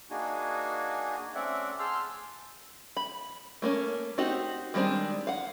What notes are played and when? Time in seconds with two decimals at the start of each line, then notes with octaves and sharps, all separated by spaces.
0.10 A#3 D4 D#4 F#4 G#4 G#5
1.35 A3 C4 C#4 D5 E5 F#5
1.79 G#4 A5 C6 E6 F6 G6
2.97 B5
3.62 A3 A#3 C#4
4.18 C4 D#4 F#4 G4
4.74 D#3 G3 G#3 C4 D4
5.27 F5 F#5